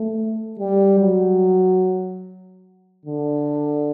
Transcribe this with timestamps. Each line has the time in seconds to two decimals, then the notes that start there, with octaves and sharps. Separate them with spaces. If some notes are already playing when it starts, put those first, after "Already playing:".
Already playing: A3
0.59 G3
1.00 F#3
3.06 D3